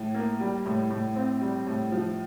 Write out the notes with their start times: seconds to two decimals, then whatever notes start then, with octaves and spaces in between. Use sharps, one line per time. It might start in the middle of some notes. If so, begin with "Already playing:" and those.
Already playing: A2
0.14 A#3
0.40 G3
0.65 A2
0.90 A2
1.16 C4
1.41 G3
1.67 A2
1.92 F3